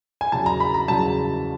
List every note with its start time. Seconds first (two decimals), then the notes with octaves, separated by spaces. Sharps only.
0.21 G#5
0.32 E2 C#3 F#3 A5
0.46 A#5
0.60 B5
0.74 A#5
0.88 E2 C#3 F#3 A5